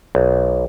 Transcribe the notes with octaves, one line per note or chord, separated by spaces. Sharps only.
B1